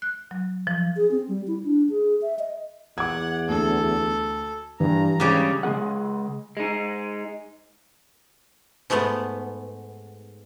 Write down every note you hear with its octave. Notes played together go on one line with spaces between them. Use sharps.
F#6
F#3
F3
G#4
C4
G3
E4
D4
G#4
E5
D#5
E2 F#5 D6 G#6
D2 A4
G2 E3 A#5
G#2 C#3 G3 C#4
C#3 G#3 B3 G#4 F#5
G#3 D#4
G#2 G#3 A3 B3